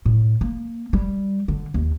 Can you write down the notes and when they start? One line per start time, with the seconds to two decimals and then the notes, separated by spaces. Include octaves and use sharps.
0.06 A2
0.41 A#3
0.93 G3
1.48 D3
1.74 D#2